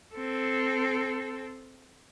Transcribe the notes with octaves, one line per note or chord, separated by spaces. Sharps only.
C4 A4